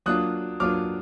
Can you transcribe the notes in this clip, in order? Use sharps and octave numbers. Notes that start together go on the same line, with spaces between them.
F#3 A#3 D4 F4 D#6 F#6
F#3 A#3 D4 F4 D6 F6